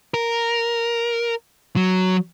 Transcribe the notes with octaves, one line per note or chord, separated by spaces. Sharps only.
A#4
F#3